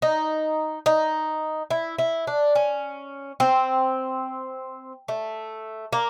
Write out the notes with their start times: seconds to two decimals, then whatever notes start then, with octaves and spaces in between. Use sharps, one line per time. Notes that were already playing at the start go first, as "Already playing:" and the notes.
0.02 D#4
0.86 D#4
1.70 E4
1.99 E4
2.27 D4
2.55 C#4
3.40 C4
5.08 A3
5.93 A#3